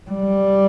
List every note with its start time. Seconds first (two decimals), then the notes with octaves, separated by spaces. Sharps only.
0.10 G3